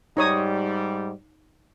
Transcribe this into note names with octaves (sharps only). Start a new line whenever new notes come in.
G#2 G3 D#4 C#5 D#6